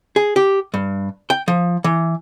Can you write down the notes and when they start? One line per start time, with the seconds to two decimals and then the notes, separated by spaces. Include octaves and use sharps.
0.16 G#4
0.36 G4
0.74 G2
1.30 G5
1.48 F3
1.84 E3